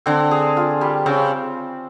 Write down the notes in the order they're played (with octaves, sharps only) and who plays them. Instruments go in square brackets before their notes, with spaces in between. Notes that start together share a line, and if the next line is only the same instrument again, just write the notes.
[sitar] D3 [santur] C4
[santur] G#4
F4
G3
[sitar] C#3 [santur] C4